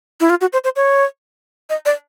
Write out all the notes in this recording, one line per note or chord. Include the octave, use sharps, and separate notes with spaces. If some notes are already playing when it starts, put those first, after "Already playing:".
E4
F4
F#4
C5
C5
C#5
D#5
D5